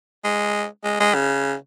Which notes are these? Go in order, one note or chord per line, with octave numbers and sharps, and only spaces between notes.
G#3
G#3
G#3
C#3